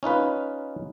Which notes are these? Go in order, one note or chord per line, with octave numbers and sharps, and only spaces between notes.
C#4 D#4 F4 B4